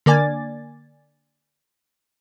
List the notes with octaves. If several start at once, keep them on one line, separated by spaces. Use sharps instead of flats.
D3 A#3 D5 G#5 A6